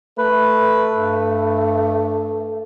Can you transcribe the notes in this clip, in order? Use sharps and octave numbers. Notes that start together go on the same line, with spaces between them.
A3 B4
G2